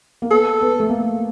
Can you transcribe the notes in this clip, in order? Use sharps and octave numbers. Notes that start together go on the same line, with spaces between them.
A#3
B3 A4
B3
A3
A#3